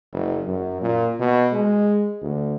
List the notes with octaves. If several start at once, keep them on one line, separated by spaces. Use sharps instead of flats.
F#1
F#2
A#2
B2
G#3
D2